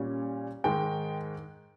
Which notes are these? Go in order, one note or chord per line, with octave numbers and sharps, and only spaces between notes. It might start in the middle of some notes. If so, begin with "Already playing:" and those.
Already playing: A#2 G3 C#4
G#2 D#3 G#3 G5